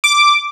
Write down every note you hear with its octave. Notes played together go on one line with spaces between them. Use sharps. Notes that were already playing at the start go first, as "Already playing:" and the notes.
D6